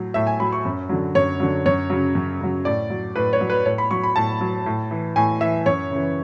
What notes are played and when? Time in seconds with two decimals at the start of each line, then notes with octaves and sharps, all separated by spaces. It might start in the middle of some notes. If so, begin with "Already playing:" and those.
Already playing: A2 F#3
0.14 A2 E5
0.27 G#5
0.40 F#3 B5
0.52 C#6
0.65 F#2
0.89 D3 F#3
1.15 F#2 C#5
1.40 D3 F#3
1.66 F#2 C#5
1.90 C#3 F#3
2.15 F#2
2.41 C#3 F#3
2.65 A2 D5
2.90 F#3
3.16 A2 B4
3.33 C#5
3.41 F#3
3.50 B4
3.65 A2 C#5
3.78 B5
3.91 F#3 C#6
4.04 B5
4.16 A2 A5
4.41 F#3
4.66 A2
4.91 E3
5.16 A2 G#5
5.41 E3 E5
5.66 F#2 C#5
5.91 C#3 E3